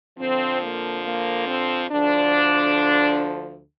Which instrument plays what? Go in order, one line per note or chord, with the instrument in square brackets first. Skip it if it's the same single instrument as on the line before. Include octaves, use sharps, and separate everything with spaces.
[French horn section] F2 D3 F3 C4
A#3
A#3
C4
D2 D3 F3 D4